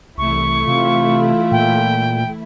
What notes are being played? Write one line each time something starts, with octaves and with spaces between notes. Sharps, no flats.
C2 E3 A3 E4 C#6
C3 F4
A#2 G5